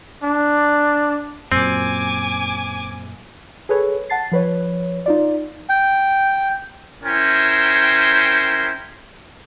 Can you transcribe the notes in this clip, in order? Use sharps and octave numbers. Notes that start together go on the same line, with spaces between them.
D4
F#2 A#2 C4 G#5 D6
G#4 A4 B4 C#5
F#5 A5 A6 C7
F3 B4 C#5
D#4 F4 D5
G5
C#4 E4 A#4 C5 G5